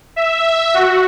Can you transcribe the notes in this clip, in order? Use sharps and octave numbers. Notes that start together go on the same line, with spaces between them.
E5
F#4